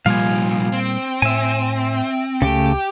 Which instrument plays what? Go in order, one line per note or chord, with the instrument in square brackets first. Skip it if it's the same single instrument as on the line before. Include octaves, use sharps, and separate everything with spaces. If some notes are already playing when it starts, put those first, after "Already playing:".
[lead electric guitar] C2 F3 [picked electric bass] A#2 G3 A#3 [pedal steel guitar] F5 G#5
[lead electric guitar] C4
[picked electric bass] A2 [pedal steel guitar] E5 G#5
[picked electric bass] C#2 [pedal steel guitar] C#3 A3 [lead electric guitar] G4